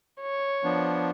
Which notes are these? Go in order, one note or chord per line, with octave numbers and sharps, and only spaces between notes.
C#5
F3 B3 D4